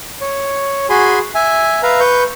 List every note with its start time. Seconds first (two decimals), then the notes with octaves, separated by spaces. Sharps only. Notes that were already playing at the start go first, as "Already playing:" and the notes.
0.21 C#5
0.89 F#4 G#4 G#5 B5 C6
1.35 E5 G#5
1.83 B4 E5 F5 A#5
2.00 B4 C#6 G6